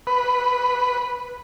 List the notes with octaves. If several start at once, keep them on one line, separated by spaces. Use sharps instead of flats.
B4